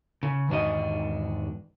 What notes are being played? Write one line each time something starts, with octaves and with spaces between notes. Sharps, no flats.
C#3
E2 G#2 D#3 D4 F#4 D#5